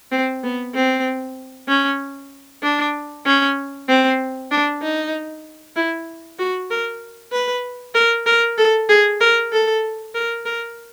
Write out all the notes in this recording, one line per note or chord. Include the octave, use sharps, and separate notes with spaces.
C4
B3
C4
C#4
D4
C#4
C4
D4
D#4
E4
F#4
A#4
B4
A#4
A#4
A4
G#4
A#4
A4
A#4
A#4